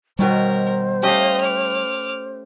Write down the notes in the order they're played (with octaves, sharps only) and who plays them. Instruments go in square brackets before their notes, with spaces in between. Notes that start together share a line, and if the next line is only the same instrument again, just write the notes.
[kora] B2 D#3 C#5 [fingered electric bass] G3 [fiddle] A#4 [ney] C5
[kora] A3 C#4 G4 [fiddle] D#5 F5
[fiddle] D6 F6